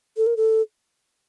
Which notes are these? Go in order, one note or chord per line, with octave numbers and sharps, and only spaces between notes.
A4
A#4
A4